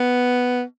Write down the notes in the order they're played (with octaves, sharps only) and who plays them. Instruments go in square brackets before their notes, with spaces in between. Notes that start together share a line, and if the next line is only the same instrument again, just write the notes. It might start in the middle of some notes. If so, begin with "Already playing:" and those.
Already playing: [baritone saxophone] B3